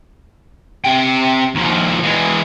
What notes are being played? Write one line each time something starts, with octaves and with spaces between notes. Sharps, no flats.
C3 G5
D#2 F3
E3 G#3